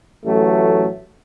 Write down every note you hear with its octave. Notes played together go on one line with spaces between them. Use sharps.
A1 F#3 A3